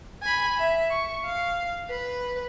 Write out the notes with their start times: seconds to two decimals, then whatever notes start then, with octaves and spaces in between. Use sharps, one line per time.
0.23 G#5 B5
0.58 E5
0.91 C#6
1.25 F5
1.90 B4